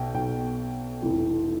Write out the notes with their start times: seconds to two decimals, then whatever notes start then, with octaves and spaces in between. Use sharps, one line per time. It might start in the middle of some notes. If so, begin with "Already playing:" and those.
Already playing: B1 B2 G5
0.14 B1 B2 G5
1.02 F1 F2 E3